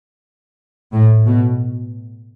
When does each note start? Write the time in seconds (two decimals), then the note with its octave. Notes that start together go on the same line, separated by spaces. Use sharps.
0.92 A2
1.26 B2